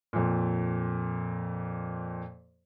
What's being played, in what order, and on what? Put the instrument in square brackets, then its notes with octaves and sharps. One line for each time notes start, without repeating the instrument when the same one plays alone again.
[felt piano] F2 A#2